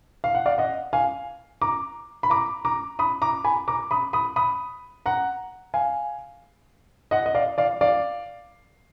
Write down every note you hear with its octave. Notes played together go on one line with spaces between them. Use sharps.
F5
F#5
D5 F5
D#5 F#5
F5 G#5
A#5 D6
B5
A#5 D6
A#5 D6
B5 D#6
A#5 D6
G#5 B5
A#5 D6
B5 D#6
B5 D#6
B5 D#6
F#5 A#5
F5 G#5
D#5 F#5
D#5
D5 F5
D5 F5
D5 F5